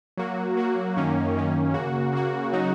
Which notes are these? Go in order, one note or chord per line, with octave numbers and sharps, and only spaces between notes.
F#3 A#3 F#4
F#3 A#3 F#4
F#2 D#3 A#3 C#4
F#2 D#3 A#3 C#4
C#3 A#3 F#4
C#3 A#3 F#4
C#3 F#3 D#4 F#4